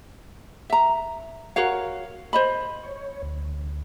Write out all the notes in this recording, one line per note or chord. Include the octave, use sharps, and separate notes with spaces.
E5 A#5
F#4 A#4 C#5 F5
C5 D#5 B5
C#5
D2